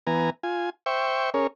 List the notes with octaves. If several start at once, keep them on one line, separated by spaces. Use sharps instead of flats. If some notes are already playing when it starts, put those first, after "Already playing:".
E3 B3 G#5 A#5
F4 G#5
C5 E5 G5 C#6
C#4 G#4 A#4 C#5